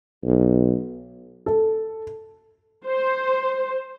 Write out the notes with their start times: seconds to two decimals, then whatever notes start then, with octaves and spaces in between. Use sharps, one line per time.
0.24 B1
1.46 A4
2.85 C5